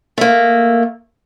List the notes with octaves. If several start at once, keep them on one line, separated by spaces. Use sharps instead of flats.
A3 A#3